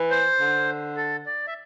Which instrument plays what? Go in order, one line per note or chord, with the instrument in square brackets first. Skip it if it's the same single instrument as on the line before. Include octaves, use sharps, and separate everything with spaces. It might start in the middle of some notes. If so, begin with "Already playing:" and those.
Already playing: [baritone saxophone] E3
[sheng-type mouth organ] C5
[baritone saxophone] D3
[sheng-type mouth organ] A4
D5
E5